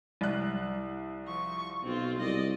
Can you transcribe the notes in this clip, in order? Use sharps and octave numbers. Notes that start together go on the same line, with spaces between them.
C2 F#6
F3 C#6
B1 C4 F4
C2 D5 D#5